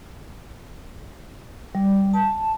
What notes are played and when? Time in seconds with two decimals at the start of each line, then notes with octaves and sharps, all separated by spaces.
1.75 G3
2.14 A5